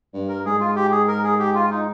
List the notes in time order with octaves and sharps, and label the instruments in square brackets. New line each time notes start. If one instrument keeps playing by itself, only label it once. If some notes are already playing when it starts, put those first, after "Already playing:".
[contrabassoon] G2
[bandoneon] A#4
[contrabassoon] G#2 [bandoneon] G#4
[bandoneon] F4
G4
G#4
A#4
G#4
G4
F4
D#4